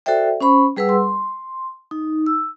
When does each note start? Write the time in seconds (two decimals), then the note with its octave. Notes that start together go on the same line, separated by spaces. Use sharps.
0.06 F#4 A4 C5 D5 E5 G5
0.41 C#4 C5 B5 C#6
0.77 G3 G#4 B4 F#5 E6
0.89 C6
1.91 D#4
2.26 E6